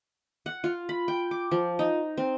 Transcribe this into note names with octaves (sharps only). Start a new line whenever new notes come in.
F#5
F4
B5
G5
D6
F3
D#4
C4